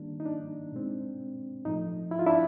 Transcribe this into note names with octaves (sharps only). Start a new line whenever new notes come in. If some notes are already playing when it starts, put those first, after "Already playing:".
Already playing: D#3 G3 A#3 D4
D#4
D4
B2 G#3 C4
A2 F3 A3 D#4
E4
F4
D4 E4